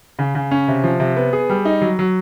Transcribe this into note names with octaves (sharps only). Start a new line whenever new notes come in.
C#3
C#3
C#4
C3
F3
C3
B3
G#4
G3
D#4
F#3
F#3